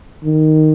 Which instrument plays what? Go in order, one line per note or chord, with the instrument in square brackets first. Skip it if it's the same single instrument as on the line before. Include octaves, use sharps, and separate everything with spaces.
[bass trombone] D#3